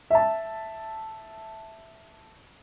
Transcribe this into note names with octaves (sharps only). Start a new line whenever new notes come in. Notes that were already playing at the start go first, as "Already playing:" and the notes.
E5 A5